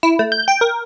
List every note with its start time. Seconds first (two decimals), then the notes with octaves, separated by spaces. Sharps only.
0.03 E4
0.19 A3
0.32 G6
0.48 G5
0.61 A#4